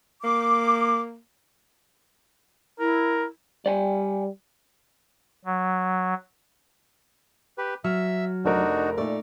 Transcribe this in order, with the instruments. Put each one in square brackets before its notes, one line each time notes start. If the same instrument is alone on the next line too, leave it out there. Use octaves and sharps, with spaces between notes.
[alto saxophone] A#3 [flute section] D6
[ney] E4 [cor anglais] A#4
[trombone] G3 [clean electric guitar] D5 G5 G#5
[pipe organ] F#3
[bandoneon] G4 B4
[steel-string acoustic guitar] F#3 [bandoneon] E5 E6 [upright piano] F6
[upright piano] F1 A#4 [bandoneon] D4 D#4 F#4
[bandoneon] A#2 [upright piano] A3 [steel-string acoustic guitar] D#4 D5